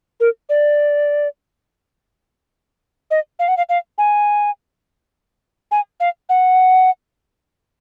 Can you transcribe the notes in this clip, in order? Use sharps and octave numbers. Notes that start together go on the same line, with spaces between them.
A#4
D5
D#5
F5
F#5
F5
F5
G#5
G#5
F5
F#5